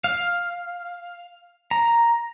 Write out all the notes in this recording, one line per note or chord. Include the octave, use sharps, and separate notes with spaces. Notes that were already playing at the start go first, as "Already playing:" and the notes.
F5
A#5